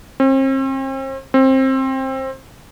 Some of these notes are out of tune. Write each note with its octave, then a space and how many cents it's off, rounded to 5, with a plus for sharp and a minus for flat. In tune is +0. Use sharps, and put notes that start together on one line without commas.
C4 +40
C4 +20